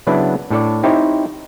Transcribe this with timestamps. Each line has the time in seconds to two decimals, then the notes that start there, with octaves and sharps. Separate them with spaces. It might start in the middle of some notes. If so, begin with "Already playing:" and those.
0.07 C#3 F#3 B3 D4 E4 B4
0.50 A2 D4 A4 C#5 D5
0.83 C4 D#4 E4 G4 C5 C#5